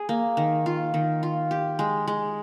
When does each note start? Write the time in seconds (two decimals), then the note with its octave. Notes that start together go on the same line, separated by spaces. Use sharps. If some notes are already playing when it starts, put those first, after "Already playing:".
Already playing: G#4
0.09 A#3
0.37 D#3
0.66 F4
0.94 D#3
1.23 F4
1.51 G4
1.79 G#3
2.07 G#3